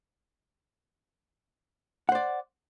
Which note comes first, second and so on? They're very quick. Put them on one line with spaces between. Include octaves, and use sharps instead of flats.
F#5 C5 D5